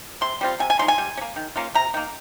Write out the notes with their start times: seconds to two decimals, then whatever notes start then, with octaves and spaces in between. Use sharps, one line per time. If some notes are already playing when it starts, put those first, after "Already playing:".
0.21 C3 C6
0.41 G3 C4 F4
0.59 C3 G#5
0.70 G#5
0.79 F3 G#3 D#4 C6
0.88 G#5
0.98 G3
1.17 C#4
1.21 A#3
1.36 D#3
1.56 A#3 C#4 F4
1.75 C3 A#5
1.94 D#3 A#3